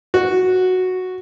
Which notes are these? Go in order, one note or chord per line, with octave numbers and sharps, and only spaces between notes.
F#4